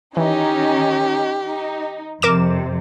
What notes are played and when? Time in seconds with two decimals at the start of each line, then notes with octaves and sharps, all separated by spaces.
0.17 D#3 E3 C#4 D#4 G4
1.43 D#4
2.22 F2 C3 A#4 D6 E7